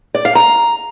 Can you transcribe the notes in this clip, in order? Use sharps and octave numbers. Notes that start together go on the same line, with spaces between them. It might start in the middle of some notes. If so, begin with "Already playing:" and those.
D5
F5
A#5